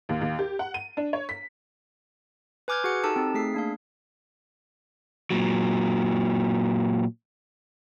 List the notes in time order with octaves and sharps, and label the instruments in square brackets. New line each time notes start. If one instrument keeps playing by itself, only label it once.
[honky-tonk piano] D#2
D#2
G4
F#5
D#7
D4
C#5
B6
[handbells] B4 G#5 D6 F6 G6 G#6
F#4 G#4 F#5 C#7
D#4 G4 A4 A5
C4 D#4
A3 G#4 B6 C7
A#3 D4 F5
[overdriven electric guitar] A#2 F#3